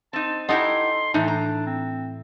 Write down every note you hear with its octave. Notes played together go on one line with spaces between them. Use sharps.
C4 D#4 A5
D#4 E4 G4 A4 F#5 A#5 C6
A2 E3 D4 D#4
A#5
C4